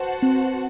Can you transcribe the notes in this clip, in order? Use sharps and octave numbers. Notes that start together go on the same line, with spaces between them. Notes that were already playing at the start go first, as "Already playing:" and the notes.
Already playing: F#4 B4 C5 F#5 A5
C4